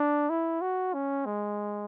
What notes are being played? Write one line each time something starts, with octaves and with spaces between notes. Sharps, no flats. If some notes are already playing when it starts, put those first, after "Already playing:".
Already playing: D4
E4
F#4
C#4
G#3